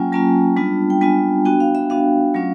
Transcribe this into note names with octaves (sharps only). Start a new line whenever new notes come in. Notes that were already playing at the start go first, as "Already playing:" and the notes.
Already playing: F#3 A#3 C#4 F4 G5 G#5
F#3 A#3 C#4 F4 A5
G3 B3 D4 F4
G5
G3 B3 D4 F4 G#5
B3 D4 F#4 G5
F5
E5
B3 D4 F#4 F5
F#3 A3 C#4 F4